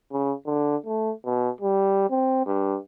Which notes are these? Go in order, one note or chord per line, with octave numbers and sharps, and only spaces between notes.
C#3
D3
A3
B2
G3
C4
G2